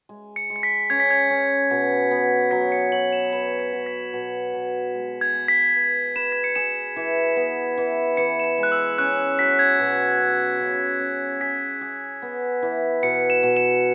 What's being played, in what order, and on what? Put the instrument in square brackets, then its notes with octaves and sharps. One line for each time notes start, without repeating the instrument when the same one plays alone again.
[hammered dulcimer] G#3
[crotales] C#7
[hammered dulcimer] G#3
[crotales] C#7
B6
[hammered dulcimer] C#4 [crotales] G#6
[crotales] B6
G#6
[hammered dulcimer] C#4
B2
B3
[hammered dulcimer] F#3 [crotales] B6
[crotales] C#7
[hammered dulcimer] F#3 [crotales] F#7
[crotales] E7
[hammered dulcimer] B4 [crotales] E7
[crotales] C#7
[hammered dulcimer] F#4
[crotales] B6
[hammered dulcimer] B2
B2
G#3
[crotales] G#6
[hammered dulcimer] G#4
[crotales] B6
[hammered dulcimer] B4
[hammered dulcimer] B4 [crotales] E7
[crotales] B6
C#7
[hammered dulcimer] G#4 [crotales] E7
[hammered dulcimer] E3
B3
E3
[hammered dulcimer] E3 [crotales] C#7
[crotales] E7
C#7
[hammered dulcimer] G#3
[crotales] F#6
E6
[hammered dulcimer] C#4 [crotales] F#6
[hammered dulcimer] F#3 [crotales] B6
[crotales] G#6
[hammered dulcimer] B2
C#4
C#3
C#4
[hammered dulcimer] G#4 [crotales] B6
[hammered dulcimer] G#4
B3
E3
[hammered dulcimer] B2 [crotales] C#7
[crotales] E7
[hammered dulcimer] B2
[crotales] E7